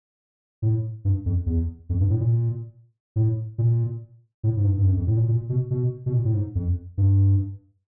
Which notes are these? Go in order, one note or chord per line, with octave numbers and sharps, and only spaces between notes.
A2
G2
F2
E2
F2
G2
A2
A#2
A2
A#2
A2
G#2
G2
G2
F#2
F2
A2
A#2
A#2
B2
B2
B2
A#2
A2
G#2
F2
G2